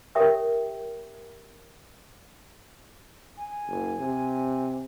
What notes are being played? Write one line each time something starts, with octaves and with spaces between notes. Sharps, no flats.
G4 A#4 C#5 E5 G5 D#6
G#5
F#1
C3